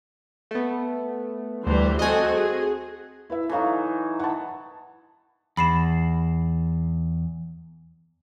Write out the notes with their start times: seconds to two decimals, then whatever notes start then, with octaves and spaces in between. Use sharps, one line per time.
0.51 A3 B3
1.67 D2 E3 G3 C5
1.99 C4 F#4 A4 D#5 G#5
2.36 G#4
3.30 E4 B4 E5
3.49 E3 F#3 D#4 A4 F5
4.19 F#5 A5
5.57 E2 B5 C7 E7